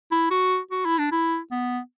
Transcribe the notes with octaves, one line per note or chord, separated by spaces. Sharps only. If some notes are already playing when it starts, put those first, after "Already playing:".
E4
F#4
F#4
E4
D4
E4
B3